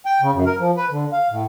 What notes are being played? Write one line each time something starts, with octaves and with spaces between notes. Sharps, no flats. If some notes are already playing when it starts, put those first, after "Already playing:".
G5
C#3
F#2
A#4
F3
B4
D3
F5
A2